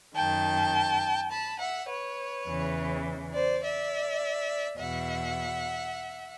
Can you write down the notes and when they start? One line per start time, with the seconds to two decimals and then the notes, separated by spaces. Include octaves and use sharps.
0.16 F#2 D#3 G5 A5
1.31 A5 B5
1.60 E5 F#5
1.90 B4 C#5
2.47 E2 C#3 E3
3.34 C5 D5
3.63 D5 E5
4.78 E2 B2 E5 F#5